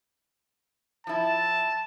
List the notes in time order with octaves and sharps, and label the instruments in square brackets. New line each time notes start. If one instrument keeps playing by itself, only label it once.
[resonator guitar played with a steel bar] F3 E4 [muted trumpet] A5